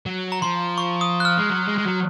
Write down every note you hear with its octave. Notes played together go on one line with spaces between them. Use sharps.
F#3
A#5
F3 C6
C#6
D#6
F#6
F6
G#3
F#3
G#3
G#3
F#3